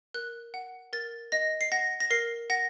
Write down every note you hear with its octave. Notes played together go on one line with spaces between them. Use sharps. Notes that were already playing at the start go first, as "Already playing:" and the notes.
A#4 F#6
F#5
A#4 A6
D#5 A#6
C7
F#5 A#6
A#6
A#4 C7
F#5 A#6